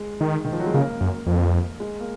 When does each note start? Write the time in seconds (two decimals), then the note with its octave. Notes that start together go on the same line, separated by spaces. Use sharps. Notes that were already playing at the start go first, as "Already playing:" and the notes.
Already playing: G#3
0.21 D#3
0.45 D#3
0.52 F3
0.60 F#3
0.66 G#3
0.74 C#3 A#3
1.01 F#2
1.27 F2
1.80 G#3
2.00 A#3